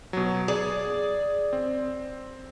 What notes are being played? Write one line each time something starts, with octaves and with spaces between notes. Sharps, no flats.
B2 F#3
G#4 D5
C4